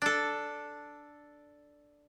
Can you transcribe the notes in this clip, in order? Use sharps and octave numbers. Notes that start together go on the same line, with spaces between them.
D4 A4